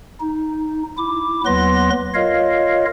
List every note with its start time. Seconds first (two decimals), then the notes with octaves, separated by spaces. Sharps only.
0.20 D#4
0.98 E4 D6
1.45 D#2 F#3 B3 B4 C6 A#6
2.15 F4 A#4 C#5 D#5 F5